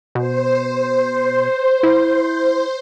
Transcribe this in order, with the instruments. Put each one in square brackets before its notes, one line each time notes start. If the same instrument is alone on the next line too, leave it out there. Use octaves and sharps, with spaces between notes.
[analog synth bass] B2 [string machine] C5
[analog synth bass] E4